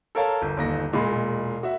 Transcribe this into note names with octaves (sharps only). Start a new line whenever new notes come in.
A4 A#4 C#5 F5 A5
G1
G1 D#2 A#6
E1 A#2 G#3 B5
F#4 E5